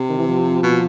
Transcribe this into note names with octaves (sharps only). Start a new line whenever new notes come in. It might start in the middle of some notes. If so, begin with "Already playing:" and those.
Already playing: C3
D#3
E3
F3
B2